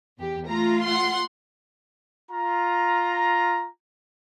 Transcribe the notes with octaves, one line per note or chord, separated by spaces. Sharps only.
E2 G4
A3 F4 A#5
F#5 C6
F4 A#5